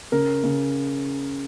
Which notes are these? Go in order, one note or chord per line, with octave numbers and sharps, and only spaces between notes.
C#3 A#4
C#3